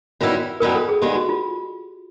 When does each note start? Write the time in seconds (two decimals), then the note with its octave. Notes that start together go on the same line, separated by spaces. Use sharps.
0.20 F#2 D#3 G3 B3 E4
0.60 F#2 D#3 G3 B3 E4 A#4
0.75 A4
0.89 G#4
1.02 G2 D#3 G#3 B3 G4
1.15 F#4
1.29 F4